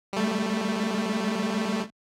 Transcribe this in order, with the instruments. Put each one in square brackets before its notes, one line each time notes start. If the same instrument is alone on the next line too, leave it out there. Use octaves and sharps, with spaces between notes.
[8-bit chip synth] G3 A3